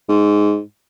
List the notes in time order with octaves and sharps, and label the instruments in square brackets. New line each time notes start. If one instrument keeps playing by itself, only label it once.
[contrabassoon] G#2